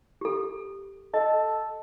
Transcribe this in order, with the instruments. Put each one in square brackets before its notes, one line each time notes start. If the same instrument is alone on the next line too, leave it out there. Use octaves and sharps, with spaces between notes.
[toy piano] G4 A4
[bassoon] A4 [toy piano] D#5